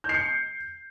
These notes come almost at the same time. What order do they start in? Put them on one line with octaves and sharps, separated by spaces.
G6 C7 C#7